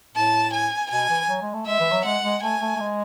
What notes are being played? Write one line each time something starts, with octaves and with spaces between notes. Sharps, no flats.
A2 A5
G#5
B2 G#5
E3
F#3
G#3
A3
G#3 E5
E3
F#3
G#3 F#5
G#3
A3 G#5
A3
A3
G#3